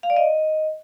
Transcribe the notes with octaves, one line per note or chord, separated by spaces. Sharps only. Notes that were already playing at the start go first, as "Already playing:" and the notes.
F5
D5
D#5